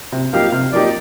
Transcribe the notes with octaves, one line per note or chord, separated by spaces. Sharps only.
C3
F3 A#3 D#4 G4 F5
C3
F3 A#3 D#4 G4 D5